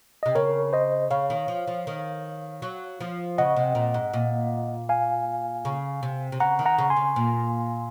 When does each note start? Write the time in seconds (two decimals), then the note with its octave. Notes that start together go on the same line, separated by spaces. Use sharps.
0.23 C3 D#5
0.35 C#3 A#4 C#5
0.73 C5 D#5
1.10 C#3 C#5 F5
1.30 D#3
1.48 F3
1.67 F3
1.87 D#3
2.62 F#3
3.01 F3
3.38 C#3 D#5 F#5
3.56 C3
3.75 A#2
3.94 G#2
4.13 A#2
4.89 F5 G#5
5.65 C#3
6.03 C3
6.32 C3
6.40 C#3 F#5 A#5
6.59 D#3
6.65 F#5 A#5
6.78 C#3
6.90 G#5 C6
6.97 C#3
7.16 A#2